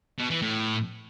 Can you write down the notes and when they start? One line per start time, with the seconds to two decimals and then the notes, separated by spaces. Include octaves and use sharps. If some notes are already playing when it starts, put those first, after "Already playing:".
0.19 B2
0.30 E3
0.42 A2